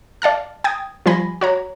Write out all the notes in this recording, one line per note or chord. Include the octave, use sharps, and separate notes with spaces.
D5 F5 A5 F6
G5 D#6 G#6
F3 G3 G#5 B5 A#6
F#4 C#5 A#5